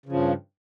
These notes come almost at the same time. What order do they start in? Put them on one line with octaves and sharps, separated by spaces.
C#3 F3 G2